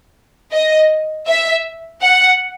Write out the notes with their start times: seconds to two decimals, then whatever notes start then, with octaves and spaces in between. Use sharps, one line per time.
0.52 D#5
1.26 E5
2.01 F#5